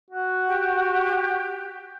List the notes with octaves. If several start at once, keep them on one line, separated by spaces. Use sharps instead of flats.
F#4
G4